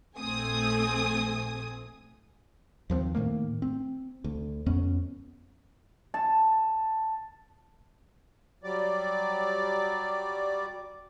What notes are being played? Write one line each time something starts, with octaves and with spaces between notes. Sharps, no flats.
A#1 A3 C4 G#5 D#6
D#2 F3 A3 C4
A2 D#3 A3 A#3
C4
D2
F2 B3 C#4
A5
F#3 G3 D5